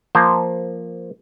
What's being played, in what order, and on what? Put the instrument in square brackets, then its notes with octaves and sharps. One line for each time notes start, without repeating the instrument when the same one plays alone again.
[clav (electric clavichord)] F3 A#3 C5